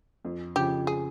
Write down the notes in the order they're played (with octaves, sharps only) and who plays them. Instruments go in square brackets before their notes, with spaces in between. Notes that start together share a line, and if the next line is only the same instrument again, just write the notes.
[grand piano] F2
[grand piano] C#3 F3 [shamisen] G4
[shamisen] G#4